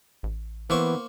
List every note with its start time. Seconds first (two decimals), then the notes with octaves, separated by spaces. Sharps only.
0.23 A1
0.70 E3 A#3 B3 C5 C#6